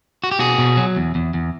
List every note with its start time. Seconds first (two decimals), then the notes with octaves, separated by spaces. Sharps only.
0.24 F#4
0.31 G4
0.39 B2 F#4 G#4
0.58 B2
0.77 F#3
0.96 E2
1.15 E2
1.34 E2